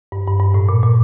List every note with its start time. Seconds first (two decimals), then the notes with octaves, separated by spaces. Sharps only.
0.12 G2
0.27 G2
0.40 G2
0.54 A2
0.69 A#2
0.83 A#2